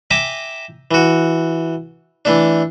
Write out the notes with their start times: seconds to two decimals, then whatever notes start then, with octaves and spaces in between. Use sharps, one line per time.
0.11 E5 G5 G#5 A#5 D6
0.91 E3 F#4
2.25 E3 A3 D4